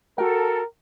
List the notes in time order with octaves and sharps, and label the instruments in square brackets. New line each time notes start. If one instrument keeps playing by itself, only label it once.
[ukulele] F#4 G5 [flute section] A4 [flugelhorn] A#4